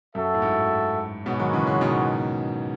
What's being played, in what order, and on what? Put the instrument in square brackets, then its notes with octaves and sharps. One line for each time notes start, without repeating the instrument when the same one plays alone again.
[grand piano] F#2 [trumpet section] F#4 A4 E5
[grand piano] A2
G#2
[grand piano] G#2 B2 [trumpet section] G#3 B3 F#4 C#5
[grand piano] D#3 F#3
C#3 E3
C#3 E3
B2 D#3